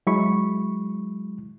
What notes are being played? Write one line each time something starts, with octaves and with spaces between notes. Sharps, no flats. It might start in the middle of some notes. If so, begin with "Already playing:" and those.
F#3 G#3 E4 B5 C#6